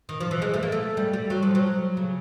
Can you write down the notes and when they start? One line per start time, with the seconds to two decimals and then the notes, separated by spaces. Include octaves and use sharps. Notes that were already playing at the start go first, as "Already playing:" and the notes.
0.09 D#3
0.20 F3
0.31 E3
0.42 G#3
0.54 A3
0.63 A#3
0.72 A3
0.97 G3
1.13 G3
1.30 F#3
1.42 F3
1.55 F#3
1.97 C#3